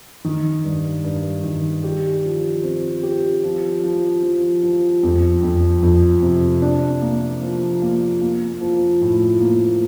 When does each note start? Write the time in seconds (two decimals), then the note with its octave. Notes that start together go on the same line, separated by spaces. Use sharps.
0.25 D#3
0.64 G2
1.04 G2
1.44 D#3
1.83 G4
2.24 F3
2.63 C4
3.03 G4
3.43 F3
3.83 F3
4.23 F3
4.63 F3
5.03 F2
5.43 F2
5.82 F2
6.22 C3
6.62 D4
7.02 A#3
7.42 F3
7.82 A#3
8.21 A#3
8.61 F3
9.01 A2
9.41 A#3